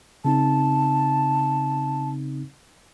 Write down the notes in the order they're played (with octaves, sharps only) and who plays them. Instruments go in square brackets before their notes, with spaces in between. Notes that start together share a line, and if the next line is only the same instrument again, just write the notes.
[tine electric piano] C#3 C4 D#4 [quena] A5